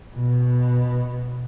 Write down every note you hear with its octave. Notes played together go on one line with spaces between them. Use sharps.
B2